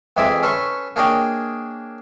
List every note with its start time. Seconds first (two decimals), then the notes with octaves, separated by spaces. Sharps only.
0.17 F2 E3 G#3 G#4 D5 E5
0.43 C#4 A4 B4 C6 C#6
0.96 A#3 D4 G#4 C#5 D#5 G5